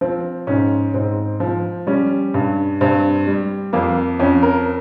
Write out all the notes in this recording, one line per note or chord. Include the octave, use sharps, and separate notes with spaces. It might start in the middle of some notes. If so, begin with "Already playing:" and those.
F3 C4
G#2 C#4
G#2 C4
F3
G3 C#4
G2
G2 C4
G3
F2 A#3
F2 C#4
A#4